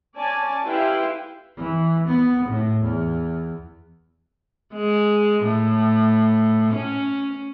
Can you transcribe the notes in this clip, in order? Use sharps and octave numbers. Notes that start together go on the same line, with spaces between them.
C#4 D5 G#5 A5
E4 G4 B4 F5 G5 C6
E3
B3
A2
E2
G#3
A2
C#4